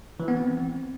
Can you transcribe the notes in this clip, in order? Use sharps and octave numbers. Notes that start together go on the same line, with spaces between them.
E3
B3
C4